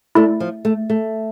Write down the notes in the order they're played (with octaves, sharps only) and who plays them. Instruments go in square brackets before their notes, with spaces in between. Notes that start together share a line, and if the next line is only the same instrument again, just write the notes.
[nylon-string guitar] A3 [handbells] E4 A4 D5
[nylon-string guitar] F3
A3
A3